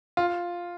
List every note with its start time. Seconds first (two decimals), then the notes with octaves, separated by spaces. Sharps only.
0.17 F4